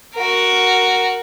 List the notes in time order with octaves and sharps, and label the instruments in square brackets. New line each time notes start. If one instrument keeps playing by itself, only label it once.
[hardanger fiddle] F#4 A#4